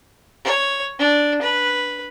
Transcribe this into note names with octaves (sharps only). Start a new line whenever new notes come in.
C#5
D4
B4